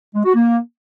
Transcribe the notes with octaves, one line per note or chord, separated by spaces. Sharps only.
G#3
F#4
A#3